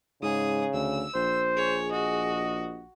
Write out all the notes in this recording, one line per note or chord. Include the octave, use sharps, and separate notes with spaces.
G#2 C#3 G#4 D#6
D2 E6
A#1 C5
G#4 C#5
F#4 D#5